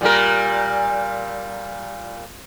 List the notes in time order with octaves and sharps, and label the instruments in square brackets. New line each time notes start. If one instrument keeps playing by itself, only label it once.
[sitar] A#2 G3 A#4